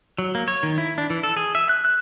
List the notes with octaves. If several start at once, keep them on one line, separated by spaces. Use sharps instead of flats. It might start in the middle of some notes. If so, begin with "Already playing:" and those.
F#3
A#3
C#5
D#3
E4
D4
E3
A4
G#4
E5
F#6
F#6